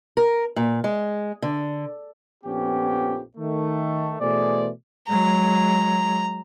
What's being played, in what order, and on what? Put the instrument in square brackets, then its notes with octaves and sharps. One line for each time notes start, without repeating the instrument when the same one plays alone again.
[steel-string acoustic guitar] A#4
A#2
G#3
D3
[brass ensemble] A#1 F2 B3 C#4 G4
D#3 A3
B2 E3 A3 G#4 C5 D5
[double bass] F#3 G#3 [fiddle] A#5